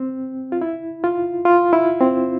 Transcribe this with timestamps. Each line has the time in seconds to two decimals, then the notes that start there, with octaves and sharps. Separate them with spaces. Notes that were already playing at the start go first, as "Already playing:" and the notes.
Already playing: C4
0.52 F4
0.61 E4
1.04 F4
1.45 F4
1.73 E4
2.01 C4